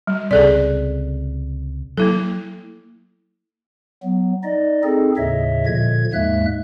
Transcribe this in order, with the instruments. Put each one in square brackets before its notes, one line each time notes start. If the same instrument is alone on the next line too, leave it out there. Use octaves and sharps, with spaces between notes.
[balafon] G3
[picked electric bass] C#2 C3 [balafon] G#4 A4 D5
[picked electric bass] F#3 [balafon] A#3 E4 A4
[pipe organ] F#3 B3
D#4 D5 D#5
C4 D#4 G#4 A4
D#2 A2 C#3 C#5 D#5 E5
A#2 D3 F3 G#6
D#2 G#2 G#3 A#3 E5 F#6